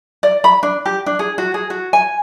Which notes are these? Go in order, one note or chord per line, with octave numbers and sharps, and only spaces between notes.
D5
B5
D4
G4
D4
G#4
F#4
G#4
F#4
G#5